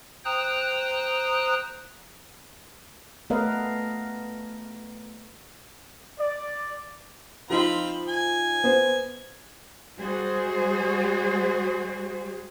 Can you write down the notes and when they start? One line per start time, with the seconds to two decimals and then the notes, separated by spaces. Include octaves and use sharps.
0.25 C5 G5 A#5 D#6 F#6
3.30 A3 B3 A#4 B4 D#5 F5
6.19 D5
7.50 F3 C4 D#4 F4 B5
8.08 G#5
8.64 B3 C5
9.96 G3 G#3 F#4 G#4 C5